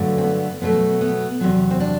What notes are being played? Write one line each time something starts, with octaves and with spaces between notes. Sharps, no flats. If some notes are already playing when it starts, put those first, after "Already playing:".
Already playing: G2 D3 F#3 A3
C4
B3
B2 F#3 A3 B3
B3
E2 C3 F#3
C4
D4